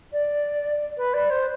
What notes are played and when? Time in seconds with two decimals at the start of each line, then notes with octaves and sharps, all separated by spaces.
0.12 D5
0.97 B4
1.13 D5
1.30 C5